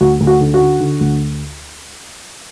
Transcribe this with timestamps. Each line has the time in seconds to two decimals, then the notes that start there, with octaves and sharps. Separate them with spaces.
0.01 D2 F#4
0.20 D2
0.27 F#4
0.41 D3
0.54 F#4
0.60 D3
0.80 D3
1.00 D2